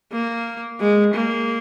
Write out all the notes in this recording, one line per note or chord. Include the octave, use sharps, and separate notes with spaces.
A#3
G#3
A#3